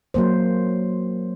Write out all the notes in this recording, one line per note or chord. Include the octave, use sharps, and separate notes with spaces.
F#3 A#3 C5